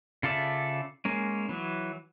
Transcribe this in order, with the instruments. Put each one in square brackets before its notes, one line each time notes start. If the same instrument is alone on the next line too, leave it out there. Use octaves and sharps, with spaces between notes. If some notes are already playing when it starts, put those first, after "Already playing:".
[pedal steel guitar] C#3 F4 A4 D5 E5
G#3 A#3 C#4
E3 F#3